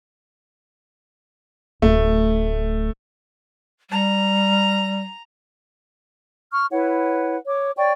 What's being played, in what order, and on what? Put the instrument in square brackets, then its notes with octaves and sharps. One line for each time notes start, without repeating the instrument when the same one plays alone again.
[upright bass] D1 [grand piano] A3
[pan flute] G3 [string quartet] A#5
[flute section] C#6 F6
E4 B4 C#5 F#5
C#5 D6
C#5 D5 G5 C#6